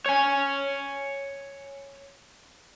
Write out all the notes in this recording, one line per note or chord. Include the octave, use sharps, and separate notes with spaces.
C#5 G#5